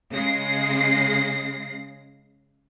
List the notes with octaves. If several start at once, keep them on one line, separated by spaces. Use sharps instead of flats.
C#3 G#3 A#6 C7